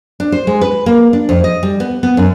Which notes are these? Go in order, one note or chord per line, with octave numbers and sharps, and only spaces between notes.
D4
C5
G#3
B4
A#3
D4
F2
D#5
G3
B3
B3
F#2